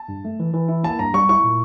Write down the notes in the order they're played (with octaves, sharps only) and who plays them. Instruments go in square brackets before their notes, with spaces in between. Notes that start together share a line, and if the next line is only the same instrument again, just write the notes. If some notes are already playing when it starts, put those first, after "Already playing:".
Already playing: [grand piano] A5
[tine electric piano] G2
A3
E3
E3
E4
[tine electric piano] A#3 [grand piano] A5
[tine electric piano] G2 [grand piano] A#5
[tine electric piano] G3 [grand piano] C#6
[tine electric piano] E4 [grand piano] C#6
[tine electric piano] A#2